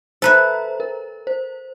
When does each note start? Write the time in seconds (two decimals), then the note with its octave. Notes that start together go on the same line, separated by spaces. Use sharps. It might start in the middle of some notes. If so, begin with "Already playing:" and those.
0.22 A4 B4 C5 E5 A#5
0.80 A#4
1.27 C5